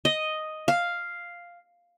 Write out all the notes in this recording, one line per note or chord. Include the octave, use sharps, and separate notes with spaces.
D#5
F5